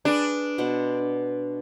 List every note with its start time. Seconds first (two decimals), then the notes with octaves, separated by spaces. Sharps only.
0.05 D4 G#4 B4
0.58 B2 C5 F#5